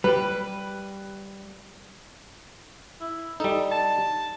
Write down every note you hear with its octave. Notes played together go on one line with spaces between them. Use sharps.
G3 G4 B4
E4
G3 D#4 A4
A5